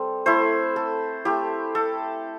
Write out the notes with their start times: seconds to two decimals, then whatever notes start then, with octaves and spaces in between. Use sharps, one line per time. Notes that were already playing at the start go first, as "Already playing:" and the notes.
Already playing: G3 C4 A4
0.26 A3 E4 C5
0.76 A4
1.25 A3 E4 G4
1.75 A4